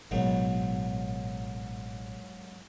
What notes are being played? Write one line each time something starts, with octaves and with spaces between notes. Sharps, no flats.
A1 G#2 B2 D#3 F#3